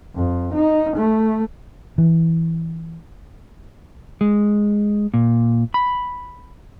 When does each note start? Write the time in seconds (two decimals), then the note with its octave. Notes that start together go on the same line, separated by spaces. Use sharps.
0.15 F2
0.54 D#4
0.97 A3
1.98 E3
4.21 G#3
5.14 A#2
5.74 B5